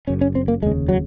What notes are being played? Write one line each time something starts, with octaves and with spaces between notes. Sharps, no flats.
F#1 F#2 C#3 C#4
C#4
C4
A#3
F1 D#2 C#3 G#3
F#3